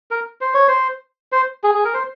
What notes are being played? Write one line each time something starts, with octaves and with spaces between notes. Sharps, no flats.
A#4
C5
C#5
C5
C5
G#4
G#4
A#4
C5